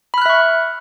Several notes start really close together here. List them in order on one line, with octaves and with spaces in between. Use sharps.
B5 F6 F#6 E5 C#6